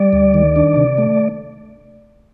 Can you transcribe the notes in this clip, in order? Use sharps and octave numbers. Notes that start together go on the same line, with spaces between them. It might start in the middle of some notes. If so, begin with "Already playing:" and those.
Already playing: G3 D5
D2
D#3
D4
C3
A3